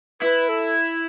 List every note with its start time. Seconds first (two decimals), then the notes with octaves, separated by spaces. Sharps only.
0.21 E4 B4
0.49 A4